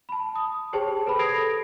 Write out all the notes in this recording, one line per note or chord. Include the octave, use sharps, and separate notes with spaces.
A5 B5
D#6
G4 G#4 C5 C#5 G5 A5
A4 B4 C5 B5
D#6 G#6 A#6 C7 D7 F7